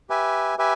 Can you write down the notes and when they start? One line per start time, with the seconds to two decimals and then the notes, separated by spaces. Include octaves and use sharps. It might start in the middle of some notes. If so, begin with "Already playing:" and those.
0.10 G4 B4 E5 G#5
0.58 G4 B4 E5 G#5